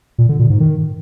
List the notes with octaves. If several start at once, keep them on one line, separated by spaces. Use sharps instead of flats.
A#2
D3
A#2
G#2
D#3